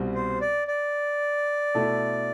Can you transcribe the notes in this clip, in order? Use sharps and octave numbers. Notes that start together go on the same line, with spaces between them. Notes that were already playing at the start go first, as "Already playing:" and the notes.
Already playing: C2 B2 G3 C4
C5
D5
D5
B2 A3 E4 A4